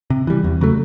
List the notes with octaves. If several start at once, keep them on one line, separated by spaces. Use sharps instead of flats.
C3
E3 G3
E2
C#3 F#3 A3